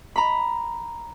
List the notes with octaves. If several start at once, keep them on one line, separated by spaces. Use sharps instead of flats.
A#5 B5